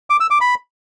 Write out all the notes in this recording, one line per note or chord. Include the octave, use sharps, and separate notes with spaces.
D6
E6
D6
B5